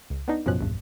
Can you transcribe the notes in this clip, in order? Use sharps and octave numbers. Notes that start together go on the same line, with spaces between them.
C#2
B3 D4 D#4
A1 F#2 B2 F3 C#4 F#6
A#1 E2 G2